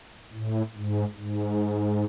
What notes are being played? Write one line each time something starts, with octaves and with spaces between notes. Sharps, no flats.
A2
G#2
G#2